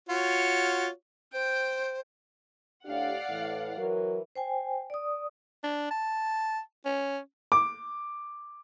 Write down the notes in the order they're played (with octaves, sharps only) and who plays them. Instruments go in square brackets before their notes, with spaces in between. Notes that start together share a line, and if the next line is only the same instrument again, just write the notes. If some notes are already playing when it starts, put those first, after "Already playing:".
[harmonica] F4 F#4 C#5
[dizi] C5 [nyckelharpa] G5
[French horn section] A2 D4 G4 [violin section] D5 F5 F#5
[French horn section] A2 E3
E3 F#3 A#4
[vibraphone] C5 G5 G#5
D5 D#6
[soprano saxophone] D4
A5
C#4
[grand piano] D6